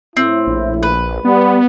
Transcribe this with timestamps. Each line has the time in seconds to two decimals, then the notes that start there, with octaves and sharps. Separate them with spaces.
0.17 A2 C4 E4
0.47 A#1
0.83 B4
1.25 G3 B3